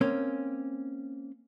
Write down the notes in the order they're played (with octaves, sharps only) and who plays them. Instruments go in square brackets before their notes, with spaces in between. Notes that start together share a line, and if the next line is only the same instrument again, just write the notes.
[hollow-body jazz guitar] A#3 C4 C#4